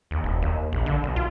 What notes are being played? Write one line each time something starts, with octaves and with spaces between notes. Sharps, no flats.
D#2
E1
D#2
A#1
D3
B1
F4